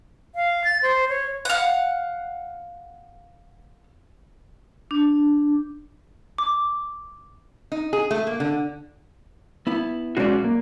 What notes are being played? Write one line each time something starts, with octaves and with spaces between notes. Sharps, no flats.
F5
A6
C5
C#5
F5 F#5
D4
D6
D#4
G#4
A3
A#3
D3
B3 E4
B1 G#3 C#4 F#4 D5
A#3